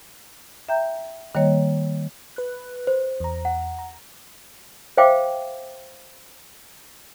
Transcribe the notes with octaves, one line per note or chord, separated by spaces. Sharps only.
E5 G5 A#5 G6
D#3 G3 A#3 C#5 D#5
B4 F#6
C5
E2 A#5
F#5
A#5
C5 E5 F5 G5 D6